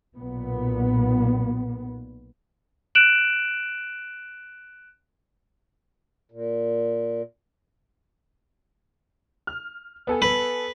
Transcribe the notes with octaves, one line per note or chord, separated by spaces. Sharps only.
B1 A#2 B3
F#6 D7 E7 F#7
A#2
F6
B3 A4 G#5
B4